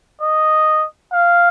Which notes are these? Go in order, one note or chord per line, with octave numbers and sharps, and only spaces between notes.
D#5
F5